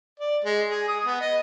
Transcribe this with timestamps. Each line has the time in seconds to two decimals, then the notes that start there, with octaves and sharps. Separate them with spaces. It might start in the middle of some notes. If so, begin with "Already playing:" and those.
0.20 D5
0.44 G#3
0.70 G#4
0.88 D#6
1.06 B3
1.21 D#5